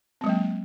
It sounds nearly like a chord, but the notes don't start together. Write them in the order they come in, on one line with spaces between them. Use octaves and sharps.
C4 G#3 F#3 A#3